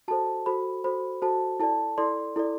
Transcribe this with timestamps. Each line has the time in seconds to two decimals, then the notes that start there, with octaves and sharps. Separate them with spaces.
0.08 F#4 A4 C5 A5
0.46 F#4 A4 C5 B5
0.84 F#4 A4 C5 B5
1.22 F#4 A4 C5 A5
1.60 E4 A4 D5 A5
1.98 E4 A4 D5 C6
2.36 E4 A4 D5